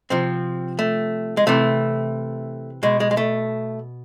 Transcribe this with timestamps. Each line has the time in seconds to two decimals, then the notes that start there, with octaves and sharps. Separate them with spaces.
0.10 C3 F3 C4
0.79 A3
1.37 G#3
1.47 C3 E3 A3
2.83 B2 G#3
3.00 G#3
3.11 G#3
3.17 A3